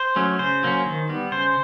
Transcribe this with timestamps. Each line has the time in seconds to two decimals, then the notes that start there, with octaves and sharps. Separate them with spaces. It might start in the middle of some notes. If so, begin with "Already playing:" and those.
Already playing: C5
0.16 F#3 A3 C#4
0.39 C#3 C5
0.63 F#3 A#3 C#4
0.86 D#3
1.09 G3 B3
1.32 C#3 C5